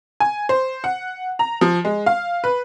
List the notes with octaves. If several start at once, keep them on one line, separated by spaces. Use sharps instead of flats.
G#5
C5
F#5
A#5
F3
G#3
F5
B4